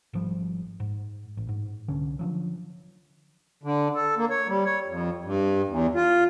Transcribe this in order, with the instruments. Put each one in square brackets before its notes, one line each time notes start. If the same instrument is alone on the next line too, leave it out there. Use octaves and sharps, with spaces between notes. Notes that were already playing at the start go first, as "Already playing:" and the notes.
[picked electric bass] G#1 F3 G3
G#2
A1
G#2
C2 D3 C#4
D3 F3 F#3
[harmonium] D3
A4
A#3
C#5
G3
C#5
F2
G2
E2
F4